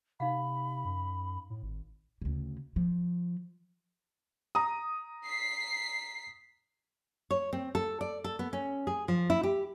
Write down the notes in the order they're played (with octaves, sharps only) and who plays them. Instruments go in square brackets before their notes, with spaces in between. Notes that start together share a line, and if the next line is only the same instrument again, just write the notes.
[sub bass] C3 [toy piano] D#4 F5 F#5 [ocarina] B5
[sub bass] F#2
A2
G#1
[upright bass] D2 C#3
F3
[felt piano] A#5 D#6
[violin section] B6 C7
[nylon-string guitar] C#5
C4
A4
D5
A4
B3
C#4
G#4
F3
E4
G4